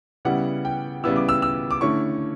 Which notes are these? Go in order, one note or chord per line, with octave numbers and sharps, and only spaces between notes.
C#3 G3 B3 E4 F#5
G5
C#3 G3 B3 E4 E6
D6
E6
E6
D6
D3 A3 C#4 E4 C#6